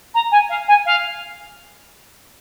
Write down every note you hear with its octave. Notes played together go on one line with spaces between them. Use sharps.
A#5
G#5
F5
G#5
F5